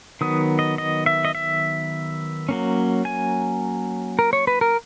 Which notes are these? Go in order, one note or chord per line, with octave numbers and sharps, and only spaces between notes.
D#3 F#3 B3 D#6
D#5
D#5
E5
D#5
E5
F#3 A#3 C#4
G#5
A#4
C#5
B4
A#4